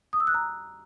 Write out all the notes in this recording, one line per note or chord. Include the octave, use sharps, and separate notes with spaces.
D#6
E6
F#6
A#5